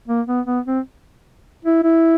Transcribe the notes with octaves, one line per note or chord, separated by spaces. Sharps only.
A#3
B3
B3
C4
E4
E4